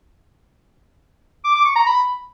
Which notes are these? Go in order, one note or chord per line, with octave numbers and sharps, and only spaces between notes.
D6
D6
C#6
A#5
B5